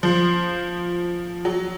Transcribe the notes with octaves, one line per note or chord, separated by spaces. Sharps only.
F3 C5
F#3